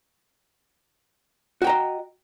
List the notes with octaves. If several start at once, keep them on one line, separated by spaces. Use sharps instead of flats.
F#4 D#5 G5 A#5